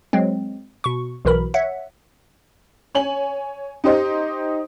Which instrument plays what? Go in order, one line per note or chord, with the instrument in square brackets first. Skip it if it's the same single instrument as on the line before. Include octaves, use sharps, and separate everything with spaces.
[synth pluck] F#3 G#3 C4
B2 C#6
B1 B2 E3 A#4 B5
C#5 E5 F#5
[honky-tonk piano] C#5 G#5 F#7
D#4 G4 C5 D#5